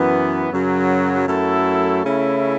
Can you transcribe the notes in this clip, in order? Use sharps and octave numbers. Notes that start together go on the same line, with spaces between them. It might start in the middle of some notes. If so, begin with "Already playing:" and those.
Already playing: F#2 E3 B3
F#2 C#3 F#3
F#2 F#3 A3 E4 A4
C#3 A3 C#4 E4